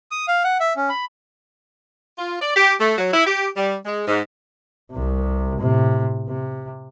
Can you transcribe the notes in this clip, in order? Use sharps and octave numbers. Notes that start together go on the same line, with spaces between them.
D#6
F5
F#5
E5
C#4
B5
F4
D5
G4
A3
F#3
E4
G4
G3
G#3
G#2
C2 C3
A2 C3
C3